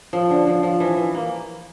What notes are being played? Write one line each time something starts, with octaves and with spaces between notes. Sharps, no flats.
F3
D3
F3
F3
E3
E3
A#3